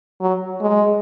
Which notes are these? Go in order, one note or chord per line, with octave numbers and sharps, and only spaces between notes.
F#3
G#3